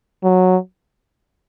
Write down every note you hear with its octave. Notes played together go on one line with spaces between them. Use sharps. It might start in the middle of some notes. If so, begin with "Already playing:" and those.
F#3